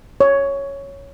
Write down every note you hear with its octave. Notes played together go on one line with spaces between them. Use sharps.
C#5